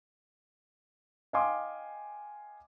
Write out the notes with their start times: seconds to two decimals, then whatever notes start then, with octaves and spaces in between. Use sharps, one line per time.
1.33 D#5 F5 G5 G#5 C6 D6